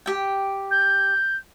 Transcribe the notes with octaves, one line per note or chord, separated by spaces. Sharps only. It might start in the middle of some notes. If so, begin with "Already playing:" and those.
G4 G5
G6